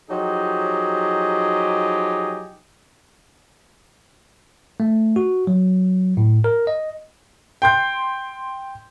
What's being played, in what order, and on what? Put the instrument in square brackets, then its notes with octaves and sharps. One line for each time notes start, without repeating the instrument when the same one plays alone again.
[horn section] F3 F#3 D#4 G4 G#4
[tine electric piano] A3
F#4
F#3
A2
A#4
D#5
[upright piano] G5 C6 G6